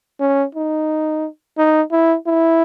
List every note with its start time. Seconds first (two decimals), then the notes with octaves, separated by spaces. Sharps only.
0.20 C#4
0.55 D#4
1.58 D#4
1.92 E4
2.27 E4